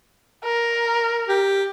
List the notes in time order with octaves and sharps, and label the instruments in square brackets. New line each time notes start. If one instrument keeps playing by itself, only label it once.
[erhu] A#4
[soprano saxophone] G4